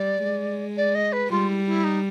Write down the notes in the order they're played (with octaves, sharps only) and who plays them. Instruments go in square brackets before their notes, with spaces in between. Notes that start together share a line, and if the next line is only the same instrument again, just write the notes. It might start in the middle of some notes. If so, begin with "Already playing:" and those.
Already playing: [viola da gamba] G3 [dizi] D5
[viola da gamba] G#3
[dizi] D5
D#5
B4
[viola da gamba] G3 [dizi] F4
[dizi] E4
E4
D#4